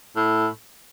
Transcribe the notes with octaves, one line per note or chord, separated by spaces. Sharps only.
A2